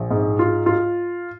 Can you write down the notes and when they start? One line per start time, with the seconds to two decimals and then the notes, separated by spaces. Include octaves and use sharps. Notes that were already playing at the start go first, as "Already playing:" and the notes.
Already playing: A#1
0.11 G#2
0.39 F4
0.66 F4